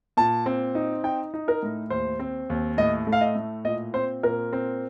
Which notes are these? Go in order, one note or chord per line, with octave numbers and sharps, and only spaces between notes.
A#2 A5
C4
D#4
D#4 G5
D#4
A#4
A2
D#2 C5
C4
D#2
A2 D#5
A3
F5
D#5
A2
A#2 D#5
C4 C5
A#2 A#4
C4